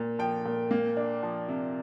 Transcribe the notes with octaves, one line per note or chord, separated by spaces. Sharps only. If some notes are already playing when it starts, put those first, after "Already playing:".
Already playing: A#2
F3 G5
A#2
A#3
D4
F3
C3